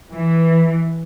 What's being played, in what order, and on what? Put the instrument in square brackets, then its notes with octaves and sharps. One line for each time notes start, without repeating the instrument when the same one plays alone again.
[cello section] E3